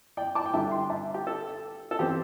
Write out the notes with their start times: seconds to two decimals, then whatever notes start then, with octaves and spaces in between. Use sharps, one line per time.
0.17 D5 G5
0.35 A5 D6
0.46 G5
0.54 D3 G3 D4 E5 A5
0.71 G5 C6
0.90 E5 A5
1.14 G4
1.27 A4
1.91 A4
1.99 E3 C4 G4